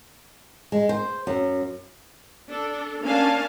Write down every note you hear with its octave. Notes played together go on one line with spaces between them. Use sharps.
G#3
C5
F#2
D4 A4
A#3 C#4 D4 F5 G#5 A5